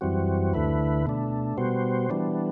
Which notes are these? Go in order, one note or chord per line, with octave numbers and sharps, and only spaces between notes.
F#2 E3 G3 C4 F#4
D2 D3 A3 E4 B4
B2 A3 D4
B2 G3 B3 F#4 C5
E3 G3 B3 D4